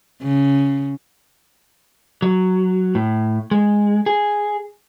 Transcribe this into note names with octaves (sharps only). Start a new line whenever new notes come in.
C#3
F#3
A2
G#3
G#4